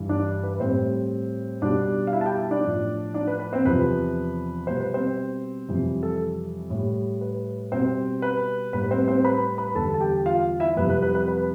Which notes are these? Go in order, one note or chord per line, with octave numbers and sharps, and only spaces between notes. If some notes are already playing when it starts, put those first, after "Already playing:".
Already playing: G2 E3 G3
D4 D5
B4
A2 G3 C4 C5
B2 G3 D4 D5
F5
E4 E5
A5
G4 G5
E4 E5
D4 D5
A2 F3
D4 D5
B4
B4
C4 C5
E2 C3 F3 B4
B2 G3 C5
B4
C4 C5
F2 C3 E3 G3
A4
A2 G3
B4
B2 G3 C4 C5
B4
A2 G3 B4
B4
C4 C5
C4 C5
B4 B5
B4 B5
E2 D3 G3 A4 A5
A5
G4 G5
F4 F5
E4 E5
F2 C3 G3 B4
B4
B4
B4
B4